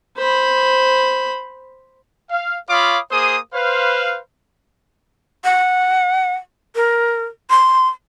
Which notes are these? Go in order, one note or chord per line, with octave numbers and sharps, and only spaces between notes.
C5 B5
F5
F4 C#5 F5 B5 D6 D#6
A#3 G#4 C5 D#6
B4 C5 F5
F#5
A#4
C6